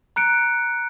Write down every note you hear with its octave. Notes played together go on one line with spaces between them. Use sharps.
A#5 F#6 C#7 D7